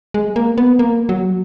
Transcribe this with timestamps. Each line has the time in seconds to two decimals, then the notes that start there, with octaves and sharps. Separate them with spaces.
0.14 G#3
0.36 A#3
0.58 B3
0.79 A#3
1.09 F#3